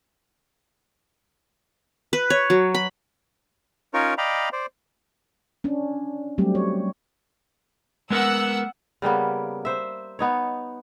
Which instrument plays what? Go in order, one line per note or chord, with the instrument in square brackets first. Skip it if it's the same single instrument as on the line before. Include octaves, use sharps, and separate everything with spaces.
[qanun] B4
C#5
F#3
B5
[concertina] C#4 D#4 F4 A#4 C#5
D5 D#5 F5 G5 A#5 B5
C5 D5
[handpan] C#4 D4
F#3 G3 A3 C4 G4
C#5
[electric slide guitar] G#3 B3 A#4 [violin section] F#5 E6
[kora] C#3 G3 A#3 B3
C5 E5
B3 D#4 C#5